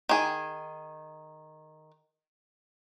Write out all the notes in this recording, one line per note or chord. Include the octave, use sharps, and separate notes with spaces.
D#3 G#4